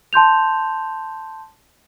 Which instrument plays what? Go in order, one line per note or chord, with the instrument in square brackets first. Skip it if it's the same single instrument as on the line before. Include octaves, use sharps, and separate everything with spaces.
[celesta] A5 C6 G6 F7